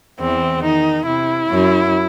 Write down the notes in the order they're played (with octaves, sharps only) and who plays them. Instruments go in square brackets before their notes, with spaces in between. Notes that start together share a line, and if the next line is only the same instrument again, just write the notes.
[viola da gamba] E2 E3 [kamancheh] C4
[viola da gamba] D#3 [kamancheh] D#4
[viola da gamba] C3 [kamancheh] E4
[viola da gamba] F#2 F#3